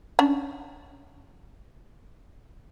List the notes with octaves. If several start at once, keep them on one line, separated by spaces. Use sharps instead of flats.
C#4 D4